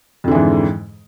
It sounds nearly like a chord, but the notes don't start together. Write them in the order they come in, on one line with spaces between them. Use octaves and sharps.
F2 D3 E3 G#2